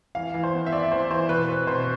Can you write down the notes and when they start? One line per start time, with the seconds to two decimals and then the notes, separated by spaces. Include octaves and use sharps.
0.15 E3 F5
0.34 E3
0.43 C5
0.54 B3
0.67 E5
0.72 B3 D5
0.91 E3 C5
1.10 E3 C5
1.29 B2 B4
1.49 C4
1.67 B2 C5